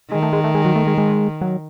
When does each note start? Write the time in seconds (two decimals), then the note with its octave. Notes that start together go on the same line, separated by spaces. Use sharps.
0.11 D#3 G#3
0.23 A3
0.33 G#3
0.44 A3
0.55 G#3
0.65 F#3
0.76 A3
0.87 G#3
0.98 G#3
1.41 F#3